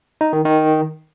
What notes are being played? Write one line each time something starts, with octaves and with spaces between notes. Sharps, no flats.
D#4
D#3
D#3